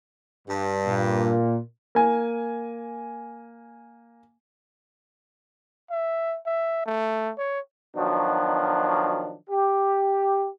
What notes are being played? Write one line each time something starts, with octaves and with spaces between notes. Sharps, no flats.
G2
A#2
A#3 G#5
E5
E5
A3
C#5
B2 D#3 F3 F#3 D4
G4